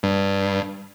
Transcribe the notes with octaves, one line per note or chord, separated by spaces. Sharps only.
G2